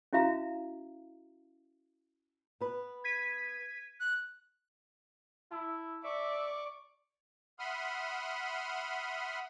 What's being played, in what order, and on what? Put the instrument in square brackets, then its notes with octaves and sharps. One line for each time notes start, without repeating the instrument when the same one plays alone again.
[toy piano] C#4 E4 F#4 E5 F5 A#5
[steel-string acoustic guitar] B3 B4
[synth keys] G#6 B6 D#7
[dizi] F#6
[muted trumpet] E4 [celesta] A5 E6
[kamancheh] D5 [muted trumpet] E5 [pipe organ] C#6 D6
[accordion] E5 F#5 B5 C6 D#6 F6